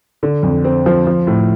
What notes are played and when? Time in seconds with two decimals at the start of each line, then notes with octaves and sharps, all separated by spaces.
0.23 D3
0.43 F2
0.64 C4
0.86 F3
1.07 F3
1.27 A2